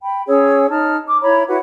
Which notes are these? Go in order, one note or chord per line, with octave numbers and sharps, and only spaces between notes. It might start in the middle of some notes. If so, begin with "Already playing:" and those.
G5 B5
C#4 G#4 C#5 E6
D#4 A5 F6
D6
E4 C#5 A#5 B5
E4 F#4 B4 F#5